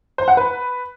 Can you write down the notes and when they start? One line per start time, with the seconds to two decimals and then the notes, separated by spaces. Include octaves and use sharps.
0.18 C5
0.28 F#5
0.37 B4